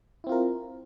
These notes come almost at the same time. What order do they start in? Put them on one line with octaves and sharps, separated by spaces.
E4 C4 F4 A#4